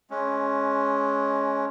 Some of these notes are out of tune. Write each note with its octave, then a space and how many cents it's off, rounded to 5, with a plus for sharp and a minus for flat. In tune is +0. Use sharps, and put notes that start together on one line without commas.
G#3 +20 C#4 +0